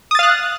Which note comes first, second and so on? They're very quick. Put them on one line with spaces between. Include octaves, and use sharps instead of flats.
D#6 A6 F5 F#6